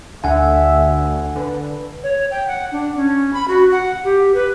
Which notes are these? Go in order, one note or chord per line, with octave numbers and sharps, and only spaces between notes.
D2 D3 E5 F#5 G#5
D3 B4
C#5
G5
F#5
D4
C#4
B5
F#4
F#5
G4
B4